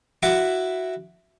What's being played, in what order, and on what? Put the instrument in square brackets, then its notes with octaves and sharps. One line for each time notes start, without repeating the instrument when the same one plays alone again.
[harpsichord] E4 F#4 D6